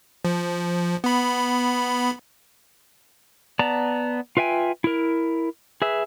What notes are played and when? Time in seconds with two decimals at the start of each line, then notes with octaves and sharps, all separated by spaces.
0.25 F3
1.04 B3 B5
3.59 B3 D5 A5 A#5
4.37 F4 B4 E5 G5 G#5
4.84 E4 A#4
5.82 G#4 B4 E5